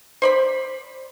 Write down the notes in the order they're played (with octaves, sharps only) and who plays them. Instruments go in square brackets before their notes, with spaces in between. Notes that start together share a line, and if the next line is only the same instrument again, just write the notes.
[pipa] C5 D5 B5